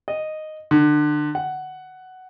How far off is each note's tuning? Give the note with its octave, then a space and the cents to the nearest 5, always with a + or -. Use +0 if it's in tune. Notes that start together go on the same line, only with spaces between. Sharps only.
D#5 -5
D3 +30
F#5 +10